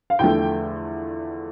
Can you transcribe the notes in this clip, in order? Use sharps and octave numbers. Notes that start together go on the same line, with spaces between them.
F5
E2 D3 F3 A3 G5